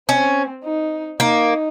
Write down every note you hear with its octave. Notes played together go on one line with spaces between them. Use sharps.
C4 C#4
D#4
A#3 D#4